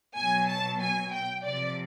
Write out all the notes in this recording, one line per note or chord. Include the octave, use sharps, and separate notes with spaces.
B2 F#3 G#5
A5
G#5
G5
C3 F3 D5